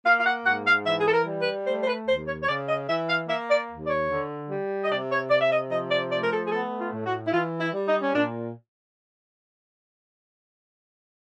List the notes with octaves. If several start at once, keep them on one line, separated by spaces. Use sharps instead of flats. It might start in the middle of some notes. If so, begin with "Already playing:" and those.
A#3 F5
F5
F#5
G#2 F#5
F5
E3 E5
G#4
A4
A#4
G3
B4
A3 C5
C5
B4
D#2 C5
C#5
C#5
C#3 D5
D#5
E3 E5
F5
A#3 E5
D5
D#2
D5
C#5
D3
G3
D#5
C3 D5
C#5
C3 D5
E5
D#5
F3 D#5
D5
A3 D5
A#4
A4
G#4
B3 A4
F4
A2
F#4
E4
E3 F4
E4
G3
D#4
C#4
A#2 D4